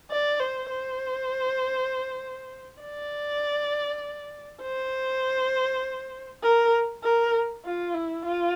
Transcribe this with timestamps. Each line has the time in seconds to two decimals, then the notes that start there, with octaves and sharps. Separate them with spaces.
0.10 D5
0.40 C5
0.70 C5
2.82 D5
4.62 C5
6.43 A#4
7.04 A#4
7.65 F4
7.94 E4
8.25 F4